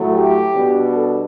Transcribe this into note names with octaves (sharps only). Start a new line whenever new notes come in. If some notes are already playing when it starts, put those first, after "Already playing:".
Already playing: A2 F#3 A3
G4
B2 G3 D4
A4